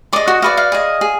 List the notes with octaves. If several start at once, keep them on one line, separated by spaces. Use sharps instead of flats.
G#4 D5 D#5 D6
F#4 F#5
F#4 B4 D5 F5
F5
G#4 D#5
G#4